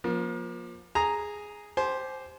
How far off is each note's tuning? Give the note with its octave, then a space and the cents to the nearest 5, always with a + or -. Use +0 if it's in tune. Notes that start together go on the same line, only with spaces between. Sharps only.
F3 +20 A#3 +35
G#4 +0 A#5 +0
G4 +0 C5 +0 G#5 +40